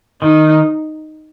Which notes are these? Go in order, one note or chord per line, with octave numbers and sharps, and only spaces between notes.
D#3 D#4